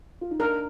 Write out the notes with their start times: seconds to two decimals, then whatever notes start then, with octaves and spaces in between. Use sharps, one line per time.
0.21 F4
0.31 D#4
0.39 D4 A#4